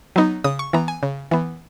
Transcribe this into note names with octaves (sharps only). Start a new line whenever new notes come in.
F#3 B3 D#4
C#3 D#6
C#6
E3 B3 A#5
G#5
C#3
E3 B3